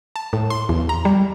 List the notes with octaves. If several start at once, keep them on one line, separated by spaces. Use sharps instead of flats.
A5
A2
C6
E2
A#5
G3